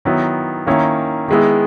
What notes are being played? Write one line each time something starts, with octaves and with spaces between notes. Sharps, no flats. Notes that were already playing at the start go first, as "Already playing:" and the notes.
D#3 F#3 B3 E4
D#3 A#3 C#4 E4
D#3 G#3 B3 E4